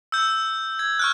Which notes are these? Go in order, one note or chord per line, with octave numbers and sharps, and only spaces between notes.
E6 G6
G#6
C#6 F6 F#6